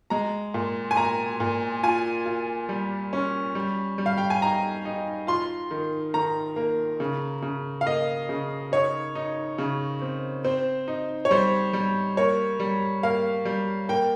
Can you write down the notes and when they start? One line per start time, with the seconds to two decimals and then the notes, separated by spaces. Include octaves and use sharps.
0.10 G#3 A#5
0.54 A#2
0.91 G#5
0.96 A#2 A#5
1.40 A#2
1.83 F4 G#5
2.26 F4
2.69 G3
3.13 C#4
3.55 G3
3.98 G3
4.06 F5
4.18 G5
4.30 G#5
4.42 D#4 A#5
4.85 D#4
5.27 F4 C6
5.71 D#3
6.14 D#3 A#5
6.56 A#3
7.00 C#3
7.42 C#3
7.81 F5
7.86 A#3 D#5
8.29 C#3
8.72 D#4 C#5
9.15 D#4
9.58 C#3
10.01 C4
10.44 C4 C5
10.88 D#4
11.25 C#5
11.31 G3 C5
11.73 G3
12.17 A#3 C#5
12.60 G3
13.03 A#3 F5
13.45 G3
13.89 A#3 G5